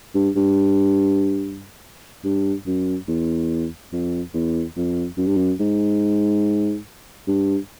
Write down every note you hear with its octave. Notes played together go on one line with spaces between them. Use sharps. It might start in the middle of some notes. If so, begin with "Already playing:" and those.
G2
G2
G2
F#2
E2
F2
E2
F2
F#2
G2
F#2
G#2
G2